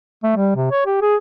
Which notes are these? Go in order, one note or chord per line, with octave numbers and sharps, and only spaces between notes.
A3
G3
C3
C#5
G4
G#4